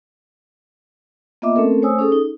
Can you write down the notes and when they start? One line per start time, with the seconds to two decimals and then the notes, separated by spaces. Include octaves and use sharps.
1.42 A#3 B3 F4 D#5 E5 D6
1.56 A3 C4 C#4 A4 A#4
1.82 A3 C5 C#5 G#5 D#6 E6
1.99 C#4 G#4 A4 D#6
2.12 D#4